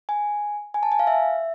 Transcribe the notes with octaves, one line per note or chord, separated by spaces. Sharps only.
G#5
G#5
A5
G#5
F5
E5